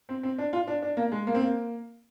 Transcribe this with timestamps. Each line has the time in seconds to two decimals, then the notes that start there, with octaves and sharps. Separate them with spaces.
0.09 C4
0.23 C4
0.38 D4
0.53 F4
0.67 D4
0.82 D4
0.97 A#3
1.12 G#3
1.27 A#3
1.35 C4
1.42 A#3